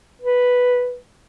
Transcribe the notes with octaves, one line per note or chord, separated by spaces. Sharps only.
B4